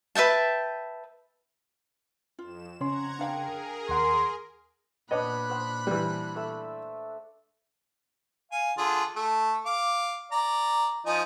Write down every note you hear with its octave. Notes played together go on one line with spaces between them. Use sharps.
B4 E5 G5 A5
F2 F4 E7
C#3 C#4 C#5 F#5 A#5 C6 G#6
D4 G#4 A#4 F5 G5
D#2 F#5 C6
A#2 B3 D4 C#5 D#5 B5 F#6
C5 F#5
E3 G3
A3 E5 E6
F5 G#5
D3 F4 G#4
A3
F5 D6
D5 A#5
F3 D#4 G#5